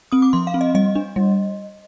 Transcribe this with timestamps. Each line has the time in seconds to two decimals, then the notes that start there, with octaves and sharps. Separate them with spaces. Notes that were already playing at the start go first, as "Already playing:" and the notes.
0.12 C4 D#6
0.22 D6
0.33 F3 C6
0.47 F5
0.54 C4
0.61 D#5
0.75 G3 D#5
0.95 D4
1.16 G3